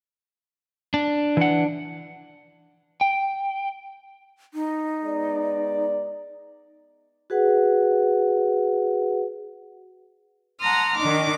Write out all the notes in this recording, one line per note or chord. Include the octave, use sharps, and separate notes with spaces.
D4
E3 F#5
G5
D#4
G#3 B3 D5
F#4 G#4 B4 F#5
F#5 A5 A#5 C6 D#6 F6
D#3 D4 D#4 D6